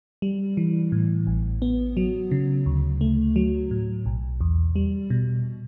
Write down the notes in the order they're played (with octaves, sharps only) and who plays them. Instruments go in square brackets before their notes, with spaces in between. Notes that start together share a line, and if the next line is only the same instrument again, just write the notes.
[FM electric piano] G3
E3
A2
A1
B3
F#3
C#3
D2
A3
F#3
A2
B1
E2
G3
B2